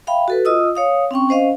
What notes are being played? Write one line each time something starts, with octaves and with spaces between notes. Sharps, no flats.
E5 F5 G5 B5
F#4 A4 B4
F4 D#5 D#6 E6
C#5 F5 D#6
C4 C#4 G5 C#6
C#4 C5 D#5 F5